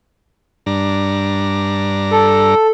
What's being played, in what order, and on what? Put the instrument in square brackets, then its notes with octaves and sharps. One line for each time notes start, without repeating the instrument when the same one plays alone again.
[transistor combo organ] G2 D4 A#5
[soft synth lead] A4